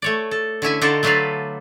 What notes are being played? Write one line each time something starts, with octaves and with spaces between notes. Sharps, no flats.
A3 C#5 D5
A4
D3 C#4 E4 G#5
D3 D#4 F4 F#4 A4 D5
F#3 A3 D4 F4 B4 F5